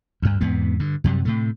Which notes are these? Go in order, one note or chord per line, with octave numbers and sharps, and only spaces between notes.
D2 G2
E2 G#2 C3 B3
G2 D3
F#2 C3 F#3 G3
A2 C3 A3